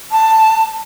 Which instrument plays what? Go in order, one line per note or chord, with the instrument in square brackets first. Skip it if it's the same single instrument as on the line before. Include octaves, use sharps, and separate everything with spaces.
[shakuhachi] A5